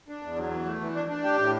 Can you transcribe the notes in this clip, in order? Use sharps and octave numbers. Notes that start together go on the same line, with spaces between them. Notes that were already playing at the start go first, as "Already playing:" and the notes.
D4
E2
F#3
E3
A3
E3
D4
D4
G4
A2